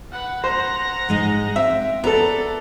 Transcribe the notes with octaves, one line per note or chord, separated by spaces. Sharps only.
B4 F#5
C5 F#5 A#5
G#2 G#3 D#4
C4 E5
B3 A4 D5 A#5